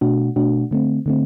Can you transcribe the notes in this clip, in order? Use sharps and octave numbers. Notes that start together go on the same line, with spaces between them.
B2 A3 D4 F#4
B2 A3 D4 F#4
D3 A3 C4
D3 A3 C4